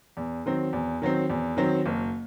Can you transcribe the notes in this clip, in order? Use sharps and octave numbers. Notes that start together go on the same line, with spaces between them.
E2
D#3 F#3 C4
E2
D#3 F#3 C4
E2
D#3 F#3 C4
F#1